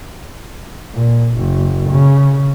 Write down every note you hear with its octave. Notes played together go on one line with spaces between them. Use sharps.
A#2
F#1
C#3